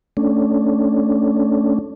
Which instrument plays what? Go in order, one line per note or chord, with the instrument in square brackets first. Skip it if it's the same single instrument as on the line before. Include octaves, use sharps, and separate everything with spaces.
[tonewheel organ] A3 C#4 D4